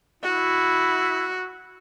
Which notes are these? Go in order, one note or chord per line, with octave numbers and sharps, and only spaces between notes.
E4 F#4